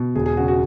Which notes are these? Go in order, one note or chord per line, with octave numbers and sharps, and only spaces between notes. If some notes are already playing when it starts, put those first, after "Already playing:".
Already playing: B2
E1 G#4
G#4
C#3 F#4
F#4